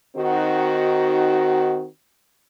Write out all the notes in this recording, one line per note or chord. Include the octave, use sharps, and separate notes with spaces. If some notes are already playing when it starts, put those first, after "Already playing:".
D#3 C4 D#4 F#4